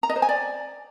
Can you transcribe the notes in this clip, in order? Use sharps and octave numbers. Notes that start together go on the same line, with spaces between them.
A#5
D#5
C5
G#5
D5